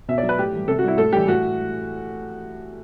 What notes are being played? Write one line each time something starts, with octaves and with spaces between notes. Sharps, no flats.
B2 E5
D5
F#3
B4
A2 G4
E3 G3
C3 A4
F#4
G3 E4
A2 A4
E3 G3 G4
A2 F#4